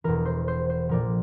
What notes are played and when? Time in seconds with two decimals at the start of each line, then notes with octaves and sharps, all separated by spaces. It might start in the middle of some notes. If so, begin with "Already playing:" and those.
0.04 E1 E2 E3 A#4
0.25 C5
0.48 C5
0.70 C5
0.89 A#1 A#2 F3 A#4 D5